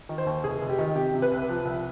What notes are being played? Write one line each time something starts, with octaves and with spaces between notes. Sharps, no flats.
D#3
C5
D#2
F1 G#4
F1
G4
D#3
C3 G4
C3
B4
C2
F3
C2